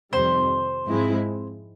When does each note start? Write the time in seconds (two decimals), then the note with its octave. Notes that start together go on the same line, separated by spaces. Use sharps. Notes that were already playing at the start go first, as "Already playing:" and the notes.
0.13 F2 C3 D#3 G3 C5
0.87 G#2 F3 G#3 C4 E4